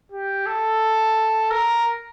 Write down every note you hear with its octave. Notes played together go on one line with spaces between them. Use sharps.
G4
A4
A#4